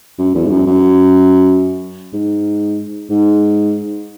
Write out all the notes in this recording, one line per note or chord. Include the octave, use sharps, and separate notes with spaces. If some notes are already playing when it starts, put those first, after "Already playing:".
F#2
E2
G#2
F#2
F#2
G#2
G#2